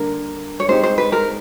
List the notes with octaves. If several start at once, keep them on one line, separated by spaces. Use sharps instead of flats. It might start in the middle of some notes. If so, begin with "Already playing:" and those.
Already playing: D3 G3 A#3 D4 A#4
C#5
G#3 C4 D#4 G4 C5
C5
B4
A#4